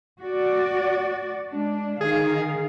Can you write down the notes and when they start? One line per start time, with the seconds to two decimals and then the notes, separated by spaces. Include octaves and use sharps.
0.20 F#4 D5
1.50 G#3 D4
2.01 D#3 G#4 F5